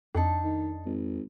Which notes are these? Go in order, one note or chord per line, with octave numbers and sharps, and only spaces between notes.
F2 D4 D#4 A4
D#3
G#1